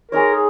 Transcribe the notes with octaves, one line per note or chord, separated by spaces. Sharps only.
G#3 D#4 A#4 C#5
G#4